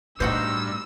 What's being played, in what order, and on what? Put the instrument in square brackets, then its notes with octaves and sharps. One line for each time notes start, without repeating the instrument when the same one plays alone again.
[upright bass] A2 [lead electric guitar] G3 D4 [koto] D#4 F#4 C5 [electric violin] E6